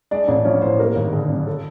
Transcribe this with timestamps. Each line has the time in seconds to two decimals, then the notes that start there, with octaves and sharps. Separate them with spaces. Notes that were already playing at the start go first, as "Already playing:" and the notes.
0.11 G#3 D4 D5
0.28 A1 D4 D5
0.45 F3 C#4 C#5
0.62 A2 C4 C5
0.79 G3 A#3 A#4
0.96 G#1
1.13 D3 G#4
1.30 F#2
1.47 A4